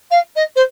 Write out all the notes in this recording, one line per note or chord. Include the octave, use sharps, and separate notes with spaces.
F5
D#5
C5